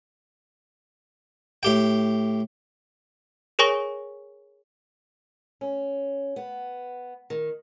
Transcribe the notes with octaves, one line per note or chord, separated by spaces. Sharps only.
A2 G4 G5
G#4 A#4 C#5 G#5 C#6 A#6
C#4
B3
D#3